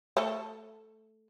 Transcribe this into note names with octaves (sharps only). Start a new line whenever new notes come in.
A3 A4